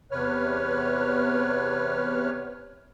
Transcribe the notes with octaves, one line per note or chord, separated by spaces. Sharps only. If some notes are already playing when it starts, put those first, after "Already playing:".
E2 C3 B4 C#5 F6